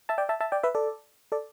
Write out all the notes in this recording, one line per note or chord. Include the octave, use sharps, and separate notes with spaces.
E5 A5
D5 G5
E5 A5
E5 A5
D5 G5
B4 E5
A4 D5
A4 D5